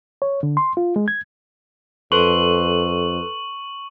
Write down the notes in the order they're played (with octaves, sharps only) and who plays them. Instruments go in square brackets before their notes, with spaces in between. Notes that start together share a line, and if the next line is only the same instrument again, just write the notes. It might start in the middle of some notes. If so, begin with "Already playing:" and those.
[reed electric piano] C#5
D3
C6
F4
G#3
G#6
[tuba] F2 [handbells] A4 B4 C6 [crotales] C#6 F#7